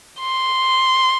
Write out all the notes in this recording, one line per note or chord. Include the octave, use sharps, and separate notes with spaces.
C6